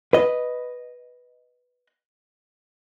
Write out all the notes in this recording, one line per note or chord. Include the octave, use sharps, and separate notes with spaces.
B4 D#5